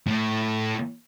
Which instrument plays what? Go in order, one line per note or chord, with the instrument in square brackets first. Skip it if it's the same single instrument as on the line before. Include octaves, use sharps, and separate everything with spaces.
[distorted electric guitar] A2 A3